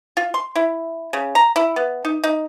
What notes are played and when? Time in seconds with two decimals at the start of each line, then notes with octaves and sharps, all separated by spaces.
0.17 F4
0.34 C6
0.56 E4
1.13 C#3
1.35 A#5
1.56 E4
1.76 B3
2.05 D#4
2.24 D#4